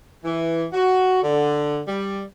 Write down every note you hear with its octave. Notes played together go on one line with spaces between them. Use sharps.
E3
F#4
D3
G3